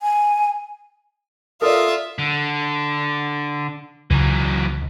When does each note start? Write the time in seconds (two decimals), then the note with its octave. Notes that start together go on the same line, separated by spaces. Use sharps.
0.01 G#5
1.62 F4 A4 A#4 D5 E5 D#6
2.18 D3
4.11 C#2 E3 F#3